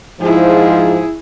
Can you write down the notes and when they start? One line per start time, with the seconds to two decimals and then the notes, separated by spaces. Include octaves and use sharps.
0.21 G#2 F3 E4 G#4